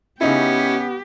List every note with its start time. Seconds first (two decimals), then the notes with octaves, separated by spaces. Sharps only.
0.21 C#3 B3 C#4 D#4 E4 G4